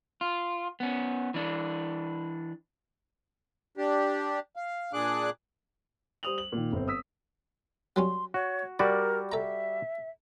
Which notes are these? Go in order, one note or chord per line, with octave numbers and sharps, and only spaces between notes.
F4
B3 C#4
E3 D4
D4 G4
F5
A#2 D4 G#4 D6 F#6
G3 C5 D#6 F7 F#7
F#7
A#2 D#3
G1 C4
D#6 E6 B6
F#3 G3 C#4 C6
F#4 C#5
G3 F#4 A#4 D5 B5
A4 E5 A#5